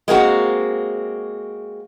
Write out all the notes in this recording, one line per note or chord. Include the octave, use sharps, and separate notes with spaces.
G#3 A#3 C4 F#4